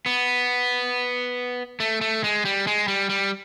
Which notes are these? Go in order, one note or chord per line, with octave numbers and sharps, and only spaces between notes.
B3
A3
A3
G#3
G3
G#3
G3
G3